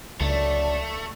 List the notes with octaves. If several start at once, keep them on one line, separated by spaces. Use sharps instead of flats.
C#2 D3 F#3 A3 D5